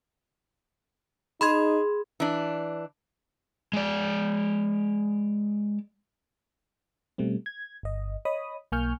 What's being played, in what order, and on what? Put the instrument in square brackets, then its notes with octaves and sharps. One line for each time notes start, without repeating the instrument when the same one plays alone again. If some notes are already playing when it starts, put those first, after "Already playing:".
[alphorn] D#4 [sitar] G#4 [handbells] B5 C6 G#6
[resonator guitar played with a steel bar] E3 D4
[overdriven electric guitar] G#3 D5
[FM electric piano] B2 G3 A3 C4
G#6
G1 D#5
C#5 D#5 B5 D#6
B1 A#3 G#5 C#6 F6 G6